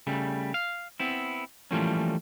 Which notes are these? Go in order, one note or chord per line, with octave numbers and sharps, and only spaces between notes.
C#3 G3 A3
F5
B3 C4 E4
E3 F3 G3 A3 A#3 C#4